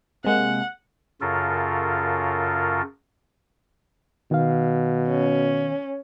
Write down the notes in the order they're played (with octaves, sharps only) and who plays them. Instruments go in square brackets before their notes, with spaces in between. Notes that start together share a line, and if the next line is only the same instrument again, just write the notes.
[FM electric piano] C3 G#3 A#3 [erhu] F#5
[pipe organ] F#2 C#3 F4 A4 A#4
[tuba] B2 [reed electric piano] D#3 F5
[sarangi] C#4